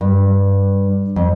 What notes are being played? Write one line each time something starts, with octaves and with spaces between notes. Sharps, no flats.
G2
F2